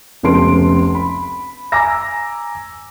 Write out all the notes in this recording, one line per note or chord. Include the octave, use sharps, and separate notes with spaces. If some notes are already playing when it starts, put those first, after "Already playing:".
F1 C#2 B3 A4 C6 D7
B5
G#5 A#5 D6 E6 A#6